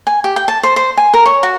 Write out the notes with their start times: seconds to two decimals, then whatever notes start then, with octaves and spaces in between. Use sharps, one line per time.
0.07 G#5
0.24 G4
0.36 G5
0.48 A5
0.63 C5
0.76 C5
0.97 G#5
1.14 A#4
1.26 C#5
1.43 F#4